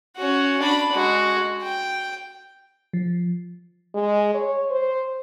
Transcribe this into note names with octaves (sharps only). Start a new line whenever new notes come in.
C#4 F#4
D4 B5
G#3 F#4
G5
F3
G#3
C#5
C5